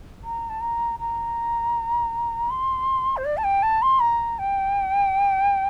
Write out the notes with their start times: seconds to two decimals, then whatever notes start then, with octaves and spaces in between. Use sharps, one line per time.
0.24 A#5
0.50 A5
0.61 A#5
0.99 A#5
2.50 C6
3.17 C5
3.25 D5
3.37 A5
3.44 G5
3.63 A5
3.82 C6
4.00 A#5
4.39 G5